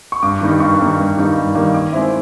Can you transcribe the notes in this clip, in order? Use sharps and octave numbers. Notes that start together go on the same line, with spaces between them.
C#6
G2 D6
D#3 G3 A#3 D#4
G2 C#6
D#3 G3 A#3 D#4
G2
D#3 G3 A#3 D#4
G2
D#3 G3 A#3 D#4
D#3 D6
G#3 C4 E4